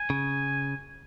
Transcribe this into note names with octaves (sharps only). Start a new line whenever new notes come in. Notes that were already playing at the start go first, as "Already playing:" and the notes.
Already playing: G#5
C#3